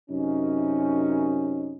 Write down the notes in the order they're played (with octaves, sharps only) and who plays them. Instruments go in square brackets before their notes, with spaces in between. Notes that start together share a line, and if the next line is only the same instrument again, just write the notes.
[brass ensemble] F#2 C3 C#4 D#4